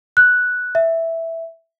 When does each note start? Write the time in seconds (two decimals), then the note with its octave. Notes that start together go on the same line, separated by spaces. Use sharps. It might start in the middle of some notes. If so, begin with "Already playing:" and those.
0.17 F#6
0.75 E5